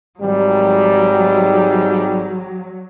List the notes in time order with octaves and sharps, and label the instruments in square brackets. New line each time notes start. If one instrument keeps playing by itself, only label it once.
[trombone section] G#1 G#2 G3 [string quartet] F#3